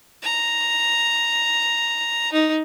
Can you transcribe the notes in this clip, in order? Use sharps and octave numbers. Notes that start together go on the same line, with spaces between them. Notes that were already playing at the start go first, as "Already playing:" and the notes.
A#5
D#4